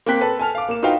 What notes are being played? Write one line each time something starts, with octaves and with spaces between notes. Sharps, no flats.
A#3 C4 G5 F#6 B6
A4 B4 A5
G#5 A5 F6 F7
F5 D6
A#3 E7
D#4 F4 F#4 B4 F5 G5